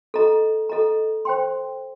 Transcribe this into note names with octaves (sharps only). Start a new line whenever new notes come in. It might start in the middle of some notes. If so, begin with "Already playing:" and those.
A4 D#5 A#5
A4 D#5 A#5
C5 G5 C6